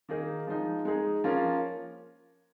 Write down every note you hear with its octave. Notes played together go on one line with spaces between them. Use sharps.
D#3 A#3 D#4 G#4
F3 G#3 D#4
G#3 D#4 G#4
F3 A#3 C#4 F4